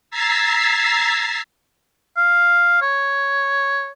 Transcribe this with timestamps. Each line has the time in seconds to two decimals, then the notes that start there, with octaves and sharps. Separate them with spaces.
0.11 A#5 E6 G#6 A6 B6 C7
2.17 F5
2.82 C#5